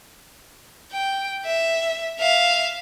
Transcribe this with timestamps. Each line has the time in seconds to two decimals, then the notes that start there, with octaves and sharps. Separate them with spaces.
0.92 G5
1.46 E5
2.20 E5 F5